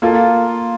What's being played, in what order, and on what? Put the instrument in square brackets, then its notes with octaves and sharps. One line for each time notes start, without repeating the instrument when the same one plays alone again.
[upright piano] A#3 F4 A4